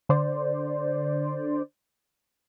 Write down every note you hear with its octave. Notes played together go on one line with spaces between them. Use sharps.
D3 C5 D5